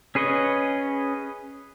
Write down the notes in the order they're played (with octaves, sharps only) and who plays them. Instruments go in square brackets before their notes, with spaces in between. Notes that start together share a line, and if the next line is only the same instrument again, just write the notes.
[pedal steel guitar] C#4 G#4 B4 C#5 D#5